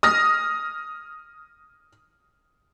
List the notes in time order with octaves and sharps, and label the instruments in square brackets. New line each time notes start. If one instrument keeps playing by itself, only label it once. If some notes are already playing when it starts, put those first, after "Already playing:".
[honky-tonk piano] D#6 F6 A#6